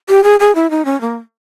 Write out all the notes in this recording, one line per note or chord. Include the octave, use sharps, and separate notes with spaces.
G4
G#4
G#4
E4
D#4
C#4
A#3